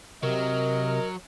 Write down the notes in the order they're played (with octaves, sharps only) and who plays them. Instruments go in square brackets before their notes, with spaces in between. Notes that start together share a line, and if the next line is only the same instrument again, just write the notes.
[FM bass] C3 [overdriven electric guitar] F#3 [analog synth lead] A#4 [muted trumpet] D#5